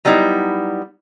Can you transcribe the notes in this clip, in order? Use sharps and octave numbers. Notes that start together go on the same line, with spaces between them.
F#3 G3 B3 D#4 E4